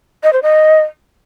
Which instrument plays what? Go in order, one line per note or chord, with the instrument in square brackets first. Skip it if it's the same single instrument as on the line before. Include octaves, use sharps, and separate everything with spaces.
[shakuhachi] D#5
C5
D#5